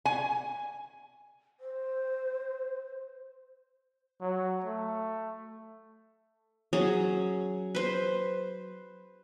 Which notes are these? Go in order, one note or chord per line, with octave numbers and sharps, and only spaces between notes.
G#5
C5
F#3
A3
F#3 C#4 G#4
B4 C5